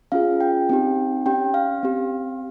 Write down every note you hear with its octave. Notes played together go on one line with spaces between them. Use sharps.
C#4 F4 G#4 F5
G5
C4 D#4 G4
C#4 G4 G5
F5
C4 G4